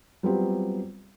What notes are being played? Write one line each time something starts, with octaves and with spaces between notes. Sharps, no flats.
F#3 G3 B3 C4 F4 G4